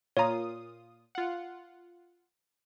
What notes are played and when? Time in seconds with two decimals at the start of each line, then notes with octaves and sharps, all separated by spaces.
0.17 A#2 F4 C#5 A#5 D#6
1.15 F4 F#5